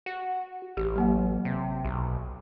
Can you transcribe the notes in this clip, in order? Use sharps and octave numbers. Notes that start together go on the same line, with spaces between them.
F#4
A1 G4
F#3 A#3 F#5
C3
B1